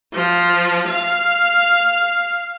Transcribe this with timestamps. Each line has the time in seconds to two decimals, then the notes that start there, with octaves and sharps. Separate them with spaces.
0.14 F3
0.88 F5